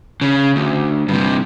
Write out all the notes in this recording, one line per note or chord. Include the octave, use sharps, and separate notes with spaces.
C#3
D2
G2 C3